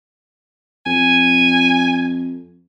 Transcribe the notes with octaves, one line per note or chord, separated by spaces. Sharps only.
F2 G#5